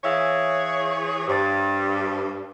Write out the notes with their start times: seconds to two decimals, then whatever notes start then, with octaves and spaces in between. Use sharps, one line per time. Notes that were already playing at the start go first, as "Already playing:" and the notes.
0.04 E3 G#4 C#5 E5 F5 E6
1.28 G2 C5 D6 A6